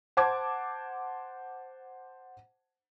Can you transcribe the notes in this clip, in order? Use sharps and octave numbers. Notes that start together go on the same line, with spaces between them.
C5 F#5 A5 D6 G#6